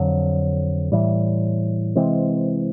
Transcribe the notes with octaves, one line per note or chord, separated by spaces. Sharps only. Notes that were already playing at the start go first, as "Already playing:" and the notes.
Already playing: F2 D3 F#3
A2 E3 G3
C3 E3 G#3 C4